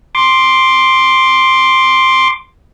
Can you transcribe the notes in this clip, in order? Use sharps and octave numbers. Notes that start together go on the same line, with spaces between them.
C6 D6